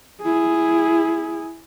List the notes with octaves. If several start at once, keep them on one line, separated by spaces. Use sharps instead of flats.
E4 G#4